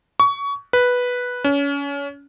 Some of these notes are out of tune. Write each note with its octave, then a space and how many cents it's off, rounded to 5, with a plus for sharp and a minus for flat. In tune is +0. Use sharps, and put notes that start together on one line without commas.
C#6 +25
B4 -5
C#4 +30